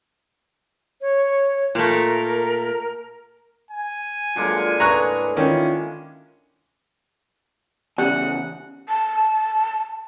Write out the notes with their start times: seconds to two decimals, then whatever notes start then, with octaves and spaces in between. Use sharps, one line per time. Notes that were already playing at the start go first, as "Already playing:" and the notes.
1.01 C#5
1.75 A#2 A3 A#4
3.71 G#5
4.36 D3 F#3 G#3 A#3 F4
4.80 A2 B4 A#5 C#6 F#6
5.37 D#3 C#4 E4 F4
7.98 E2 C#3 G3 F#5
8.89 A5